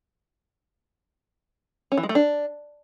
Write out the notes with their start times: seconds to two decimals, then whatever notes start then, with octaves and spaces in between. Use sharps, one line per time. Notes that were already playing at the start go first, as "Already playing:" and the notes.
1.92 C#4
1.97 E3
2.03 G#3
2.09 A3
2.15 D4